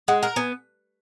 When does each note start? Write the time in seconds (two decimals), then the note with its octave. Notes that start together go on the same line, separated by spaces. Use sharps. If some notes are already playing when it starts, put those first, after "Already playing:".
0.08 G#3 F#5
0.23 A#4 F#5
0.36 B3 G#5